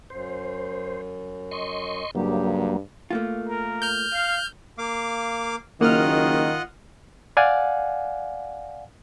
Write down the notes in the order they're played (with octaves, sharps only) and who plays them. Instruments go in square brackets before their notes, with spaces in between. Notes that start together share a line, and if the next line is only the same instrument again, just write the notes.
[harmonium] F#2 [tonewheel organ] C5
[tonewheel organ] D#5 C6 C#6
[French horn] G2 [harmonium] C#3 G4 [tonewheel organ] F#3 A#3
[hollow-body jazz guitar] A3 A#3 F4
[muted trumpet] A#4
[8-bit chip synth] F6 G6
[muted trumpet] F5
[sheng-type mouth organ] A#3 F5 D6
[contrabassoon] F#1 [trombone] D#3 [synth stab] A#3 F6 [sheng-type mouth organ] F4 D#5 F#5
[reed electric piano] D5 F5 F#5 G#5